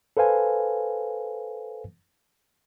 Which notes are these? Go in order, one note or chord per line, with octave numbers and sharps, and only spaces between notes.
A4 B4 C5 F5 G#5